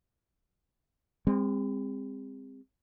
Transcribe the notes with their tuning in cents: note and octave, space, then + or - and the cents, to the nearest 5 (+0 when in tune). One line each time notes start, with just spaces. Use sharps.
G#3 -45 C4 +0